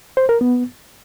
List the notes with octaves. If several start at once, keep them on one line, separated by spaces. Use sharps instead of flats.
C5
A#4
B3